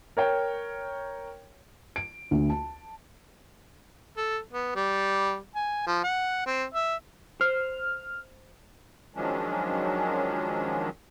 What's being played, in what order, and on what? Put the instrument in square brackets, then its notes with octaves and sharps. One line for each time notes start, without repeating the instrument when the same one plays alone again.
[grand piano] A#4 C#5 G5
[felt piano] D7
D2
A5
[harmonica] A4
B3
G3
G#5
F3
F#5
C4
E5
[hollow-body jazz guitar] C5 [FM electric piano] F6
[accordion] D#3 F3 F#3 G#3 C#4 D4